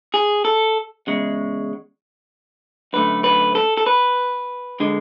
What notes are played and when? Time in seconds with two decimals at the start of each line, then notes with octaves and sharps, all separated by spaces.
0.14 G#4
0.45 A4
1.07 E2 C#3 G#3
2.93 F#2 D3 A3 B4
3.24 B4
3.55 A4
3.77 A4
3.86 B4
4.80 D3 G#3